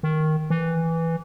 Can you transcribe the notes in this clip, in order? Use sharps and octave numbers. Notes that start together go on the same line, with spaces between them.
D#3
E3